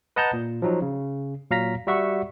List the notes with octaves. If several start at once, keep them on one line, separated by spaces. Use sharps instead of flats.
B4 D#5 F#5 A5 A#5 G6
A#2
F3 F#3 D#4
C#3
A#2 F#3 F5 A#5 A#6 B6
G3 F#4 E5 F#5 C#6